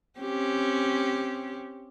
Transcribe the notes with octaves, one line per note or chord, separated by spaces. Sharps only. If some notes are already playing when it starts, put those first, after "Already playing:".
C4 C#4 G4